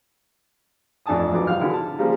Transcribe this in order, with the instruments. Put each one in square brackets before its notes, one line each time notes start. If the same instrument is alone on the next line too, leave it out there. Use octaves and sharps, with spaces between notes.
[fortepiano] A1 F2 D4 G#5 A5 D#6
B1 F2 E3 F#3 D6
G#1 C3 F4 F5 G5 F6
B2 D3 E4 F4 G#4
A5
C#3 F3 G3 G#3 A#3